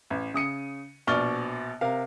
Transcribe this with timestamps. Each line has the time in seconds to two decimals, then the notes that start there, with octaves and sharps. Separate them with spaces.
0.10 A1
0.34 C#3 D#6 C#7 D#7
1.07 A#1 B2 D5 C#6 F6 G7
1.81 C3 A#4 F5